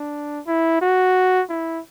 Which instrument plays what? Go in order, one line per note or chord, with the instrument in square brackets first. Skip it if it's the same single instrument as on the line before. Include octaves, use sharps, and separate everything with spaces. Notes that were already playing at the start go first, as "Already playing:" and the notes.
Already playing: [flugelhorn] D4
E4
F#4
E4